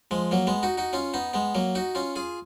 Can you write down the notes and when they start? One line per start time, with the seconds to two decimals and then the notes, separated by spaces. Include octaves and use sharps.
0.11 F3 G#3
0.31 F#3 A#3
0.47 G#3 B3
0.63 D#4 F#4
0.77 D#4 F#4
0.93 C#4 F4
1.14 B3 D#4
1.33 G#3 B3
1.55 F#3 A#3
1.75 D#4 F#4
1.95 C#4 F4
2.16 F4 G#4